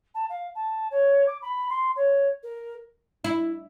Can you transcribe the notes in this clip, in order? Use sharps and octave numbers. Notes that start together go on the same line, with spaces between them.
A5
F5
A5
C#5
D6
B5
C6
C#5
A#4
E4